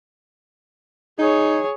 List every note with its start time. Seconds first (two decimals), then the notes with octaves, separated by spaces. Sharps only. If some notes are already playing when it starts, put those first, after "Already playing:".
1.19 D#4 G#4 C#5